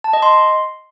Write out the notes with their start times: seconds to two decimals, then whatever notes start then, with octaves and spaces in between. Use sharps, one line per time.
0.04 A5
0.13 D#5
0.22 C6